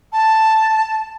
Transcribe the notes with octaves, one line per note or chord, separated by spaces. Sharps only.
A5